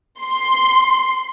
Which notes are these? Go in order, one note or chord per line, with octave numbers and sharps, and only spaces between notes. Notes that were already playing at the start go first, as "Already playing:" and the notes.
C6